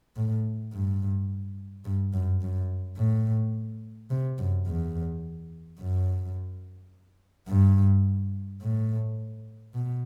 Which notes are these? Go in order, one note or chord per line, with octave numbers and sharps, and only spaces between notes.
A2
G2
G2
F#2
F#2
A2
C3
F#2
E2
F#2
G2
A2
B2